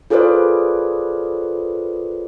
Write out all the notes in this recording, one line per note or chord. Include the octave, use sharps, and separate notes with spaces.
F4 G#4 A4 B4 C5 D5